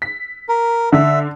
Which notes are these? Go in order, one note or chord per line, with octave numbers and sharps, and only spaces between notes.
B6
A#4
D3 E5